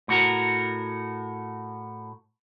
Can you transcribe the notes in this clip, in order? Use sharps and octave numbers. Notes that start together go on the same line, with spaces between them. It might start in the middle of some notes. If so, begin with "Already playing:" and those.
A2 F#4 A#4